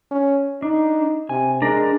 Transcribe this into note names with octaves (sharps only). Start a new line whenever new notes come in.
C#4
D4 D#4
C3 G#5
G#3 D4 A#4